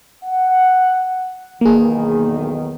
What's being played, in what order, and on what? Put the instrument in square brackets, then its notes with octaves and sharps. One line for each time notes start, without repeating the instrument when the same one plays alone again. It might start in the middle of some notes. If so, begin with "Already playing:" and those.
[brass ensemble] F#5
[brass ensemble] B1 E2 D#3 [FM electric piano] A#3 G#4